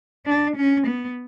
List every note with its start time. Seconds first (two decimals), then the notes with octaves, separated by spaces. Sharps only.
0.26 D4
0.56 C#4
0.87 B3